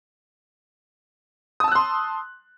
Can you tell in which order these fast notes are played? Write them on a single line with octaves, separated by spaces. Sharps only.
D#6 A5 E6 F#6 C6